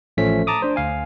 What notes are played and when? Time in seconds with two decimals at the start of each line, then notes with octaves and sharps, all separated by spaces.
0.17 A1 F3 A3 C#4 B6
0.47 A5 A#5 D6 D#6
0.62 D4 C5
0.76 D2 F5 G#5